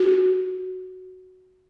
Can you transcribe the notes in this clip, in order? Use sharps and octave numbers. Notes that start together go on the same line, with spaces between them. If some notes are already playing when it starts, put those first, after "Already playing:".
Already playing: F#4